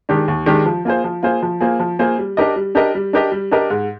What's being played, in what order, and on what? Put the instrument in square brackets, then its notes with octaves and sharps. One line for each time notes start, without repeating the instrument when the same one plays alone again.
[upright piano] D#3 G#3 D4 G4
D#2
D#3 G#3 D4 G4
F3
A#3 F4 G#4 C5
F3
A#3 F4 G#4 C5
F3
A#3 F4 G#4 C5
F3
A#3 F4 G#4 C5
G3
D4 G4 A#4 D#5
G3
D4 G4 A#4 D#5
G3
D4 G4 A#4 D#5
G3
D4 G4 A#4 D#5
G#2